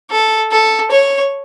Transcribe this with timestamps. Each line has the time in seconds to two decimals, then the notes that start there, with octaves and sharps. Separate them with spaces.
0.10 A4
0.51 A4
0.91 C#5